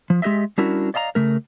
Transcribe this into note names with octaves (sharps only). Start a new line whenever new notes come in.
F3
G#3 G4 C5 D#5 E5
G3 C#4 D4 E4 F#4 A#4
D5 D#5 F5 A5 A#5
C#3 A3 A#4